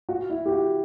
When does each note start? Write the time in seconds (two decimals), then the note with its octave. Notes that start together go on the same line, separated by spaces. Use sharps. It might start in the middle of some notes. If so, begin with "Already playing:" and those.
0.09 F#4
0.30 E4
0.46 G4
0.52 F#4